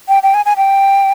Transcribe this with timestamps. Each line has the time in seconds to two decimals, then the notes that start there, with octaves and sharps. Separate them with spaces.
0.08 G5
0.23 G5
0.34 G#5
0.46 G#5
0.57 G5